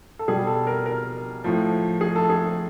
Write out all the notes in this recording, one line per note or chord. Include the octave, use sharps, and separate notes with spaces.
A4
B2 G3 G#4
A4
A#4
A#4
A2 F3
G#4
A4
G#4